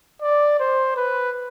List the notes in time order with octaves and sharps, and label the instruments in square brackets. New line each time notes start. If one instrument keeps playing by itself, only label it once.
[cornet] D5
C5
B4